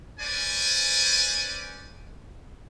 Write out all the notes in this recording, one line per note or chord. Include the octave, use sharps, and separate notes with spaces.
C#4 B4 C5 D5 G#5